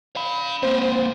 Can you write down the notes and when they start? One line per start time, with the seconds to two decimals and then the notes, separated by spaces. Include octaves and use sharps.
0.16 F5 B5
0.63 A#3 C4 C5